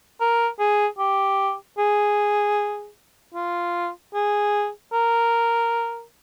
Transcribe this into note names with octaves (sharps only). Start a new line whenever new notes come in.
A#4
G#4
G4
G#4
F4
G#4
A#4